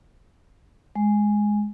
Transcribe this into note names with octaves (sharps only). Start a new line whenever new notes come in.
G#3